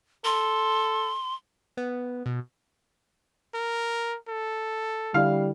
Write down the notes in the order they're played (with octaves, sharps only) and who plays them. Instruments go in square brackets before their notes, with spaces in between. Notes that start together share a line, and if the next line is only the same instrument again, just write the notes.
[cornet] A4 [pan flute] C6
[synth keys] B3
B2
[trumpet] A#4
A4
[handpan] D3 E4 [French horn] G3 [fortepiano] F5